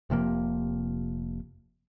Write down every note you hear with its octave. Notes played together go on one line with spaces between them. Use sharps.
F1 C3 F3 A#3